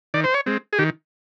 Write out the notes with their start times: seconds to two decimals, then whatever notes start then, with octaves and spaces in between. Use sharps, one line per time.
0.14 D#3 D5
0.24 C5
0.34 C#5
0.46 G#3 C4
0.73 G#4
0.79 D#3 G4